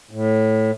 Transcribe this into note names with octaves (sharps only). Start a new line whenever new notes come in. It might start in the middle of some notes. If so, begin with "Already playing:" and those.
A2